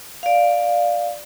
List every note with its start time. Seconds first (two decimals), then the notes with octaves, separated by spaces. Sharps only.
0.23 D5 F5